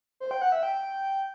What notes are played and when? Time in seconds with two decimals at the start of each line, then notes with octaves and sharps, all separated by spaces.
0.20 C5
0.31 G5
0.42 F#5
0.52 E5
0.63 G5